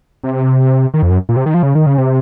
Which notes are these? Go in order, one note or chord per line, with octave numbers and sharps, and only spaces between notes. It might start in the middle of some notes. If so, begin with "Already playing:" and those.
C3
D#3
F2
F#2
A#2
C3
D#3
F3
C#3
D#3
C#3
C3